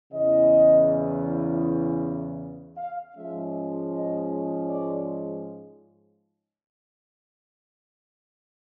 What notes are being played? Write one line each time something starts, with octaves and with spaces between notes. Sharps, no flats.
E2 C#3 E3 D#5
F5
G#2 F3 G#3 C#4 E5
D#5
D5